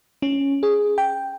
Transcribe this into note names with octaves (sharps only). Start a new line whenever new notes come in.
C#4
G#4
G5